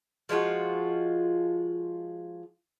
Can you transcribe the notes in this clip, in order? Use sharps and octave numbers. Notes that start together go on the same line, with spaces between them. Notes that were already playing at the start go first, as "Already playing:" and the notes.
F3 G#3 F4 F#4